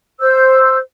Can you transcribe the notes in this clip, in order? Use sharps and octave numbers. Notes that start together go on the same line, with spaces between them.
C5 E6 G6